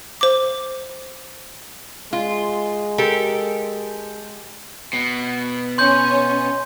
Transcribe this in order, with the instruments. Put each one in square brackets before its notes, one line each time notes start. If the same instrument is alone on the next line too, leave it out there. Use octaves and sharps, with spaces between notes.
[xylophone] C5 D6
[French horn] G#3 [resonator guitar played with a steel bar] F4
[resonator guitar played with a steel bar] G4 A4 A#4
[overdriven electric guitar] B2
[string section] C#4 [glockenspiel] C6 G6